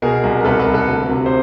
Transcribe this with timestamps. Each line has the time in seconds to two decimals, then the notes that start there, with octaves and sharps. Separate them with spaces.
0.02 B2 G#4 A#4
0.23 C2
0.41 A#4
0.45 C2 A4 B4
0.60 A4 B4
0.66 C2
0.74 A4
0.88 D2
1.09 C3
1.26 C5